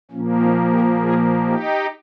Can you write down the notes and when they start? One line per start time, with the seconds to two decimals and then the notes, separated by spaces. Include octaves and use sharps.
0.11 A#2 F3 A#3 C#4
0.41 C4 D#4
0.70 G4 A#4
1.00 F4 G#4
1.46 D#4 G4